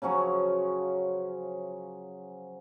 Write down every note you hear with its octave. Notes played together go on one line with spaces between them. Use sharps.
C#3 F3 F#3 C#4